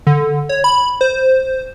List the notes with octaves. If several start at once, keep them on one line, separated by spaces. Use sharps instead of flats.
D3
C#5
B5
C5